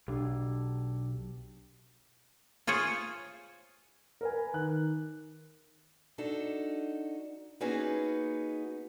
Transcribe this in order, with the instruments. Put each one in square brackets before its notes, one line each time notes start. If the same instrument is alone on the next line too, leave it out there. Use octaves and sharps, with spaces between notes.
[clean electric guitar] B1 [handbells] D4 G4
[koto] F4 G#4 C5 C#5
[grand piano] A#4 B4 G#5
[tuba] D#3 [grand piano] F#6
[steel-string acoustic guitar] D4 D#4 F#4 A4
A#3 B3 C#4 D#4 F#4 G#4